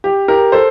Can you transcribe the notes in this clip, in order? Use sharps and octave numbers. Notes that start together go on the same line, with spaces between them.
G4
G4 A#4
A4 C5